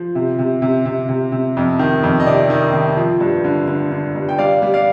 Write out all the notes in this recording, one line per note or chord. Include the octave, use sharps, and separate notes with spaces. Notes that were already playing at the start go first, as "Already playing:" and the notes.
Already playing: F3
C3
C3
C3
C3
C3
C3
F2
D#3
F2
D#5
C3 D5
D#3
D#3
F3
G2
D3
D3
D3
G2
G5
G3 D5 F5
G3
D5 F5